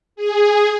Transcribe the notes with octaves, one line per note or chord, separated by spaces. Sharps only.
G#4